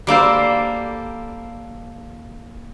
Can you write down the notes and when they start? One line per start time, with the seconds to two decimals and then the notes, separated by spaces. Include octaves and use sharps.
0.07 G3 A#3 A4 C5